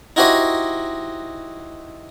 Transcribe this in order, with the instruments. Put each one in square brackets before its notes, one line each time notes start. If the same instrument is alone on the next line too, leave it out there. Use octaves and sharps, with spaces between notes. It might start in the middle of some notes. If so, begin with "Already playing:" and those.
[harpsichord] D#4 E4 F#4 G4 C5 D#5